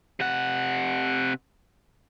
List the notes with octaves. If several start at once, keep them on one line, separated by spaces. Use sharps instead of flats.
C3 F#5